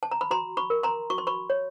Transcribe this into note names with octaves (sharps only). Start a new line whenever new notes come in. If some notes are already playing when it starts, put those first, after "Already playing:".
A5
A#5
B5
F#4 A#5 C6
B5 C#6
A#4
A#5 C6
F#4 C#6
C6
B5 C#6
C#5